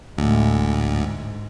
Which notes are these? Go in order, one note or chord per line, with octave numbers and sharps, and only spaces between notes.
D2 A2 G#3
G#2